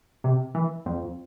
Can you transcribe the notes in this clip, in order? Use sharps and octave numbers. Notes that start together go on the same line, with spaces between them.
C3
E3
F2